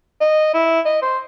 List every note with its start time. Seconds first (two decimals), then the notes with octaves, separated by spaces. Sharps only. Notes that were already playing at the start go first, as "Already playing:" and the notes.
0.21 D#5
0.54 E4
0.85 D#5
1.02 C5